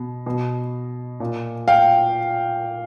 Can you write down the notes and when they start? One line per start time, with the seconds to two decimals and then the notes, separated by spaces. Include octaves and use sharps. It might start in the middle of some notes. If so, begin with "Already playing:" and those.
Already playing: B2
0.26 B2
1.20 A#2
1.68 F5 G5